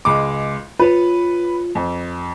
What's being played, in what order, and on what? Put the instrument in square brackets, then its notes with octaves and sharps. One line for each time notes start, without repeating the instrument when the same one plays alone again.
[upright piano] C#2 G#3 D6
[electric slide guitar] F4 C#5 [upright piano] B4 B5
[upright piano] F2